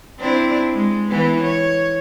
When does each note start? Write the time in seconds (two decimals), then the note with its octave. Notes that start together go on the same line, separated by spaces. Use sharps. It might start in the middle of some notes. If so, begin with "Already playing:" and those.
0.19 C4 D4 E4
0.74 G#3
1.08 E3 B3
1.42 C#5